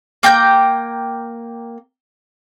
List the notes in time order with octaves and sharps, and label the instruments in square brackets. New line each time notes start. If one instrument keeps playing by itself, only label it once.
[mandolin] A#3 G5 A#5 G6